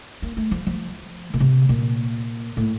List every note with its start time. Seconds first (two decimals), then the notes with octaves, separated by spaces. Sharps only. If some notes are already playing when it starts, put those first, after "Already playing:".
0.22 A#3
0.37 A3
0.51 F3
0.67 F3
1.34 A#2
1.40 C3
1.69 A#2
2.57 A2